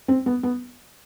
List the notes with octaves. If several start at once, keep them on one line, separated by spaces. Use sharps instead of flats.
C4
B3
B3